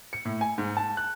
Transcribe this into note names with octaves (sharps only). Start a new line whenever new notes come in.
C#7
A2
G#5
G#2
A5
F#6